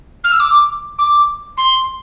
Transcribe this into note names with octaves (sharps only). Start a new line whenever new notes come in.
F6
E6
D6
D6
C6